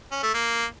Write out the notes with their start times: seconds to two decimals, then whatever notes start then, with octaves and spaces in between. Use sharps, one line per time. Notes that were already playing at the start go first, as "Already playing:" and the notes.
0.12 C#4
0.23 A3
0.34 A#3